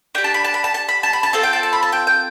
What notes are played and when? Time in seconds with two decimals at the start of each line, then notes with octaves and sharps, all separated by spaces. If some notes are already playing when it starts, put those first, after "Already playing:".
0.15 D4 G4 G5
0.24 A5
0.34 B5
0.44 A5
0.54 B5
0.64 A5
0.74 A5
0.89 B5
1.03 A5
1.13 B5
1.23 A5
1.33 C4 F4 A4 A5
1.43 G5
1.53 A5
1.63 A5
1.73 B5
1.83 A5
1.92 G5
2.07 G5